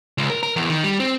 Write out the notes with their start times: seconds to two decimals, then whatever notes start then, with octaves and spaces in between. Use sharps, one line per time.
0.18 C#2
0.30 A#4
0.43 A#4
0.56 E2
0.70 D#3
0.84 G3
1.00 C4